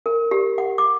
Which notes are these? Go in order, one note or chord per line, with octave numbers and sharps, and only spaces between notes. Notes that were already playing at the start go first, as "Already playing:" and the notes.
A#4
G4
F#5
D6